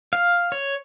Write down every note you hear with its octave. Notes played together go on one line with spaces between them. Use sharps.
F5
C#5